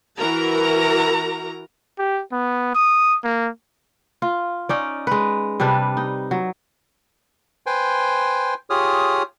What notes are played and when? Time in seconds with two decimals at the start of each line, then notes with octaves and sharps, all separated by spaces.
0.19 E3 F#4 A#4 A#5
1.99 G4
2.32 B3
2.75 D#6
3.24 A#3
4.22 F4
4.69 C#4 D#4 D5
5.07 G#3 B4
5.60 C3 G3 D4 B4
5.97 D#4
6.31 F#3
7.66 B4 C5 G5 G#5 C6
8.70 F4 G4 G#4 C#5 D#6 F6